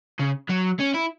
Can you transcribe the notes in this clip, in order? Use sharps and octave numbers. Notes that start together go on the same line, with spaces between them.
C#3
F#3
C#4
E4